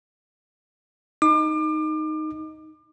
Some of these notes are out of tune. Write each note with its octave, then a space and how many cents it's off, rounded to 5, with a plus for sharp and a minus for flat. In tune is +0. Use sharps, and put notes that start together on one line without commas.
D#4 +0 D6 +35